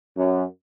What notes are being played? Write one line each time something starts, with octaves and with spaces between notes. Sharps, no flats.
F#2